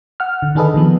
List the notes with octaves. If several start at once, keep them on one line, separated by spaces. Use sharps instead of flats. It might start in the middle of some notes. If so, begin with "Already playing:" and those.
F#5 F6
D3
D#3 D4 G#4 A4 B4 D#5
D#3 F3 B3